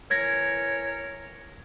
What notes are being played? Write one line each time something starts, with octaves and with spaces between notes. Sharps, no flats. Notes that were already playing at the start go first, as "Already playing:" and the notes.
E3 A#4 C#5 G#6 A#6